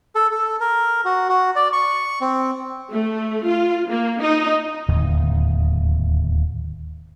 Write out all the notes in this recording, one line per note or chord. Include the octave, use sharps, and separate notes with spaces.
A4
A4
A#4
F#4
F#4
D5
C#6
C4
A3
F4
A#3
D#4
D1 D#2 G#2 C3